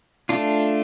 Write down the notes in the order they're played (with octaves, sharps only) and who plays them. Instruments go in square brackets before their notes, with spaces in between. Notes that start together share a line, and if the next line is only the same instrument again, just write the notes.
[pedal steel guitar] A3 D4 F4